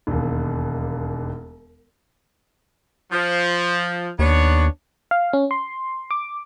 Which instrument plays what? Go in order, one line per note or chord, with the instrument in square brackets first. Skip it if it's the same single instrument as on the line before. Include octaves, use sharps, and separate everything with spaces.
[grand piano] E1 D#2
[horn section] F3
[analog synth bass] D#2 [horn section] B3 D4 C#5
[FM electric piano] F5
C#4
C6
D6